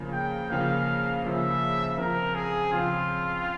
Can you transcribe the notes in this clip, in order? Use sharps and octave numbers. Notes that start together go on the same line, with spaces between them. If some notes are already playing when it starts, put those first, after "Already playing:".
Already playing: C#3 F3 A#3
G5
C#3 F3 A#3 F5
C#3 F3 A#3 E5
C#3 F3 C4 A#4
G#4
C#3 F3 C4 F4